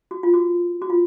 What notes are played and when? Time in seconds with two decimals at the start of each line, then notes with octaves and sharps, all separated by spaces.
0.11 F#4
0.23 F4
0.34 F#4
0.82 F#4
0.90 F4